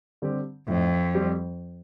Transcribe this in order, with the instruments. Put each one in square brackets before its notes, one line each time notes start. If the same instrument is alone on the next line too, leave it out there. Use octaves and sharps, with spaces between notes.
[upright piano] D3 G3 C4 G4
[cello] F2 [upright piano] A2
[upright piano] G3 C4 G4